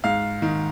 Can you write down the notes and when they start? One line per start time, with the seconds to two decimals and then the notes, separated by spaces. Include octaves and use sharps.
0.04 G#2 F5
0.42 D#3